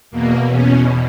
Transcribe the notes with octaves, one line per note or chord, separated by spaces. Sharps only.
E2 B2 A#3
C#4